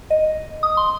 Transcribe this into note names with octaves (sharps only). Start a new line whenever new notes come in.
D#5
D#6
C6